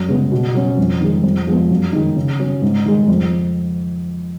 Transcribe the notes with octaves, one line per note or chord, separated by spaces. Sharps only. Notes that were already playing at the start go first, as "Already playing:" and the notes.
Already playing: F#2
C#3 G#3 B3
B2
F#3 C#4
F2
D#3 G#3
F2
F3 G#3 B3
F#2
D#3 G#3 D#4
C#3
F#3 C#4
G#2
D#3 G#3
F2